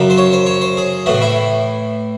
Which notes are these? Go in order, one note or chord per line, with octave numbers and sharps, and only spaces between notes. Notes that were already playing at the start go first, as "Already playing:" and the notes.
Already playing: F#2 C#3 F#3
C5
C#5
C5
C#5
C5
G#4
A2 E3 F#4
E4